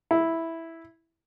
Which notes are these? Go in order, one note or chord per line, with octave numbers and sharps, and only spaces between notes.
E4